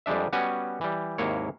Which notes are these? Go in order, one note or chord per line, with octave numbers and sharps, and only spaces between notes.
F2 G3 G#3 D4 E5
G3 B3 C#4 F#4 G#5
E3 G3
G#1 D#2 A#3 E4 C#5